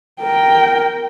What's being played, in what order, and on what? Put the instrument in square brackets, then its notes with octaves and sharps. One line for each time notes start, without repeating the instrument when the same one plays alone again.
[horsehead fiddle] A#4 G5